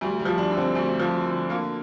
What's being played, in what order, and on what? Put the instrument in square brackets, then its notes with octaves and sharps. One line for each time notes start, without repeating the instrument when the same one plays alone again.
[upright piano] D2 G3
G3
F3
D4
D3
C4
D2
F3
D3
D3 A#3